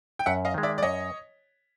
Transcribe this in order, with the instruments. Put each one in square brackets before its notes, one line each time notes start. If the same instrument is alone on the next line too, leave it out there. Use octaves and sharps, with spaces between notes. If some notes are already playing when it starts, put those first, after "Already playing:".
[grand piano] G5
[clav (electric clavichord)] F#2 [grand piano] E5 F#5
[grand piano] D#5 F5
[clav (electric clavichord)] D#3 G#3
[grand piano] D5 E5
D5
[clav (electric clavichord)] F#2 [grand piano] C#5 D#5